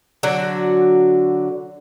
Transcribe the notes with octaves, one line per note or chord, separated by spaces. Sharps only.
D3 F#3 F#4